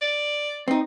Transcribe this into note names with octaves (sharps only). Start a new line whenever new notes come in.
D5
C4 D#4